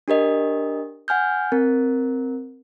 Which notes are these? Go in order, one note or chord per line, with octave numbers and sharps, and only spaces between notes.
D4 G4 A#4 D#5
F#5 G#5 F6 G6
C4 A#4